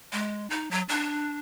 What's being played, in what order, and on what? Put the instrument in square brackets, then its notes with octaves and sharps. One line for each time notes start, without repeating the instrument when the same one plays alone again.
[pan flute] G#3
D#4
F#3
D4